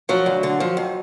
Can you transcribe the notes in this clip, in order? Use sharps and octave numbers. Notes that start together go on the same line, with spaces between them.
F3 F#3
D2
D3
F3
F2